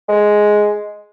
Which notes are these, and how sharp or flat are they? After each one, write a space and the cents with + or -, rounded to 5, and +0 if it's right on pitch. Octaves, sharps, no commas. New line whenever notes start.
G#3 +5